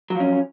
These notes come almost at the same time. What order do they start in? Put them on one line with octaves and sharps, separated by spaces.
F#3 F3 C#4